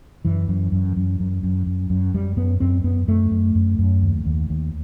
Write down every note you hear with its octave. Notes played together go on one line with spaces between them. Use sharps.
F#2 E3
F#2
F#2
F#2
F#2
F#2
F#2
F#2
F#2 G3
F#2 B3
F#2 C4
F#2 B3
F#2 A3
F#2
F#2
F#2
D#2
D#2
D#2